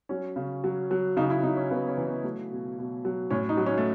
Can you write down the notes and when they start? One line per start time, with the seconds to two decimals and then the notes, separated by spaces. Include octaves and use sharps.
0.09 F#3 C#4
0.36 C#3
0.64 F#3
0.91 F#3
1.17 C#3 D#4
1.30 E4
1.43 C#3 D#4
1.57 C#4
1.71 C#3 B3
1.88 C#4
1.97 E3
2.06 B3
2.23 F#3 A3
2.51 B2
2.78 B2
3.05 F#3
3.31 A2 C#4
3.49 D#4
3.57 F#3
3.66 C#4
3.78 A3